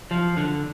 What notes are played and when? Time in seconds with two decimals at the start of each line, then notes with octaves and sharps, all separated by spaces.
0.11 F3
0.37 D3